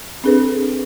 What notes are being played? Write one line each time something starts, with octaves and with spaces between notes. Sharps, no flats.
C4 D4 G#4 A4 B4